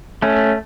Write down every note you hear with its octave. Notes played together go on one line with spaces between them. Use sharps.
A3 C#4